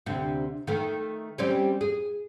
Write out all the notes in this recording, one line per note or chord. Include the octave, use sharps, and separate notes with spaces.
D2 C3
D#3 A3
G3 C4 C#4
G#4